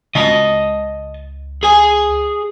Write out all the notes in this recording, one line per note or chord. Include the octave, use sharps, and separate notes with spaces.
C#2 D#5 A5
G#4 G#5